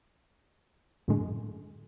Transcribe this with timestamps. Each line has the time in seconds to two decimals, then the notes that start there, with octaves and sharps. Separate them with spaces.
1.08 F#2 A2 D3 G#3